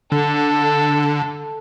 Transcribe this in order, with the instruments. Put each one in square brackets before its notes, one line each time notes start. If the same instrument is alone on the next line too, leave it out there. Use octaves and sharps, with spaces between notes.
[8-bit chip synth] D3 [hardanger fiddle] A4